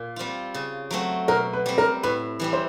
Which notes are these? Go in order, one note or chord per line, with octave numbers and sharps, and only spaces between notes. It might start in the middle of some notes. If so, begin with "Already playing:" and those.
Already playing: A#2
G3 C4 F4
C#3
F#3 A3 C4
B2 A#4
B4
G3 C4
A#4
A2 B4
E3 G3 C4
C5